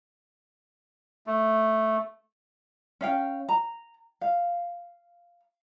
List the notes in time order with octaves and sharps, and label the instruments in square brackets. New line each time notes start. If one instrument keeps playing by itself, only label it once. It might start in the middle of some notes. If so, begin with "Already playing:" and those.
[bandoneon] A3
[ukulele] C#4 F5 G5
A#5
F5